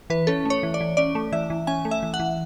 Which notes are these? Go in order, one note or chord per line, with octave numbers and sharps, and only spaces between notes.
E3 B4
C#4 A4
A3 C#5
E3
D5
E3
C#4 D5
A3
E3 E5
E3
C#4 G#5
A3
E5
E3
F#5
E3